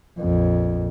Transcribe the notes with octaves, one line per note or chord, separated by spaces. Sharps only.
A#1 F2